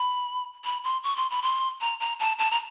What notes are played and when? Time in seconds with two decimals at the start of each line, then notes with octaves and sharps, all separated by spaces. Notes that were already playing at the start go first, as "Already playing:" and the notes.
Already playing: B5
0.65 B5
0.84 C6
1.03 C#6
1.16 C6
1.30 B5
1.42 C6
1.81 A#5
2.00 A#5
2.20 A5
2.38 A5
2.51 A#5